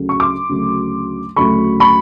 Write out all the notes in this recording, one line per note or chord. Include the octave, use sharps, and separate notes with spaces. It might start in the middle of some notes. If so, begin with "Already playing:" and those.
Already playing: D2 C#3 F#3 A3
C#6
C6 D6
D2 C#3 F#3 A3
D2 C#3 F#3 A3 B5 C#6
B5 C#6